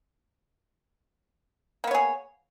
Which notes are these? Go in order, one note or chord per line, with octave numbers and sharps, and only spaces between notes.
A#3 B3 G#4 C#5